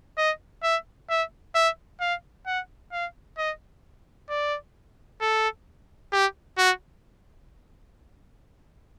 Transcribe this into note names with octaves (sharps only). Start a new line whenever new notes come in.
D#5
E5
E5
E5
F5
F#5
F5
D#5
D5
A4
G4
F#4